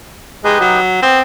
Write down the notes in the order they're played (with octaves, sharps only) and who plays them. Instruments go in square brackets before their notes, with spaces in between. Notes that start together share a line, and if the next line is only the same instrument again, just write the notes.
[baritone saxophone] G#3 [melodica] D#4 G4 B4
[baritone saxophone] F#3
[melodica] B3 [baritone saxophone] C4